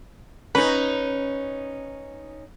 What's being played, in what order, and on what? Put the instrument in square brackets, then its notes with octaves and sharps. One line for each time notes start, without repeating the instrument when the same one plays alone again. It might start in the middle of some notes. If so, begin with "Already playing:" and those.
[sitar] C#4 D#4 [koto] B4